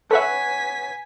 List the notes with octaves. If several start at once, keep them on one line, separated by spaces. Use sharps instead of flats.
A4 B4 C#5 E5 F#5 G#5 B6